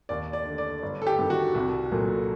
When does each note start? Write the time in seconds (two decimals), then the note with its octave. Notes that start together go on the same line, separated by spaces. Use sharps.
0.09 D#2 D5
0.33 D5
0.45 D3 A3
0.58 D5
0.83 G1
1.02 A4
1.07 G4
1.19 G2 D#3
1.30 F#4
1.55 C2
1.92 A#2 F#3 A3